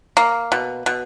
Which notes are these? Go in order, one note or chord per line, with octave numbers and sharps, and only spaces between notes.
A#3
B2
B2